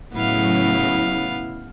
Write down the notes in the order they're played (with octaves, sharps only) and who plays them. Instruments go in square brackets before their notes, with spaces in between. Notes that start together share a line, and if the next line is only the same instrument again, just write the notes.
[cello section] A2 C#3 F#3 [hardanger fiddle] B3 F5 [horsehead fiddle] E4